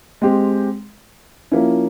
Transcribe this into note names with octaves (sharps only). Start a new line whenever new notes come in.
G#3 C4 G4
F3 A#3 C#4 E4